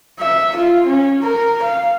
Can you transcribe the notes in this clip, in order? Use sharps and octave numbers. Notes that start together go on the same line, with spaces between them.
E5
F4
C#4
A#4
F5